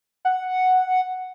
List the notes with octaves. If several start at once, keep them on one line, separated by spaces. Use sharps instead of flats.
F#5